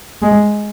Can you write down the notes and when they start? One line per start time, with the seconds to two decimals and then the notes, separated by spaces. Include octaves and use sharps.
0.22 G#3